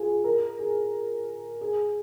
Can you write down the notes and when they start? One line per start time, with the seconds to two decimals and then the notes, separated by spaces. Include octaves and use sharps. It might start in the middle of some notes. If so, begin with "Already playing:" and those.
Already playing: F4 G#4
0.24 A#4
0.59 G#4
1.61 G#4